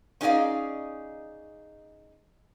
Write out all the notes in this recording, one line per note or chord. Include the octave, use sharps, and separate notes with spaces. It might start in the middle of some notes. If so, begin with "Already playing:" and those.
C#4 D#4 G#4 D5 D#5 F5